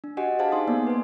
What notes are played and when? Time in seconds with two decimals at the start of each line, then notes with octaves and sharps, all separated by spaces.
0.04 D4
0.17 F#4 G4 D#5 F#5 G#5
0.39 G#4 C5 F5 G#5 A5
0.52 D#4 C6 D#6
0.67 A#3 B3 D5
0.87 B4 G#5